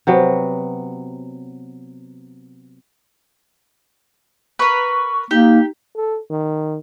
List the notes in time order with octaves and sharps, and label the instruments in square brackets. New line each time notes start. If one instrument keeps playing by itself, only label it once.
[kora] C3 F#3 B3
[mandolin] A#4 B4 [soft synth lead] C#6
[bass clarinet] A#3 [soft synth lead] D#4 [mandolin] G4
[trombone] A4
D#3